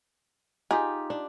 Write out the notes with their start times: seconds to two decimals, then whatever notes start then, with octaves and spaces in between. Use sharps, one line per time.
0.71 D#4 F4 G4 G#4
1.10 D4